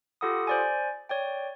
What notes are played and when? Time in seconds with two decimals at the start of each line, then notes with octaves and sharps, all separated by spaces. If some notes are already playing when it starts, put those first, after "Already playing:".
0.21 F4 G4 A4 F#5 B5 D#6
0.47 C5 D5 G#5
1.09 C#5 D5 G5